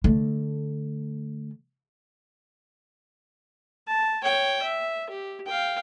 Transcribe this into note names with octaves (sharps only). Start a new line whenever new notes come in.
D3 A3
A5
C#5 G5
E5
G4
F5 G5